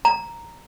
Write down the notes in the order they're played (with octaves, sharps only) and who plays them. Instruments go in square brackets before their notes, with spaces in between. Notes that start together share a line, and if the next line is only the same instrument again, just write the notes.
[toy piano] A#5